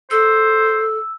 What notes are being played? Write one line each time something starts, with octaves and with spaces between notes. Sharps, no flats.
A4 C5 E6